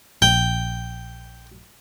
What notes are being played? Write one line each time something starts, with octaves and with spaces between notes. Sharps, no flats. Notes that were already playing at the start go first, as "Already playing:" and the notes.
A#1 G5